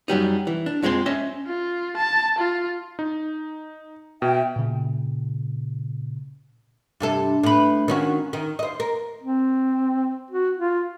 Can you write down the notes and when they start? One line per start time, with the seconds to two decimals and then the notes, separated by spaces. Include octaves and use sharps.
0.08 F#2 F#3 G3 D#4
0.47 E3
0.66 D4
0.82 F2 F3 G#3 C4 C6
1.06 C#4 D#5 E5
1.46 F4
1.97 A5
2.38 F4
2.99 D#4
4.22 B2 E5 G5
4.56 A#2 C#3
7.00 G2 C3 A4
7.43 A2 B4
7.88 D#3 C#4 F#4
8.33 D#3
8.59 C5 D#5
8.80 A#4
9.23 C4
10.31 F#4
10.57 F4